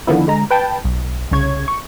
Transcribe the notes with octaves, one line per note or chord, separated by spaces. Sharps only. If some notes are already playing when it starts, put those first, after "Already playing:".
D3 D#3 F3 B3 E4
D3 G#3 A#5
B4 G5 A5
B1
C2 C#3 C#5 G#6
C#6